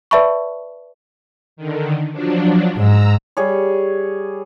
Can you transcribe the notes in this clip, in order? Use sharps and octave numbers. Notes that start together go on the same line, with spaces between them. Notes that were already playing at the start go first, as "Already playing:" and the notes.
B4 D5 E5 A5 B5 C#6
D3 D#3
F3 F#3 D4
G#2 A#5 E6
G3 G#4 C#5